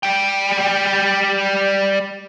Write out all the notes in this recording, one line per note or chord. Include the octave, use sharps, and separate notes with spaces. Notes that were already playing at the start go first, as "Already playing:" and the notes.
G3 G5